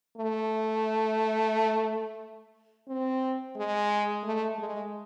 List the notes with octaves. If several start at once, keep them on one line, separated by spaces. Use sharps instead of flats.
A3
C4
G#3
A3
G#3